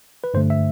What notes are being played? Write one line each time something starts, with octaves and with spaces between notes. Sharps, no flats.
B4
G2 D3 A3 C5
E5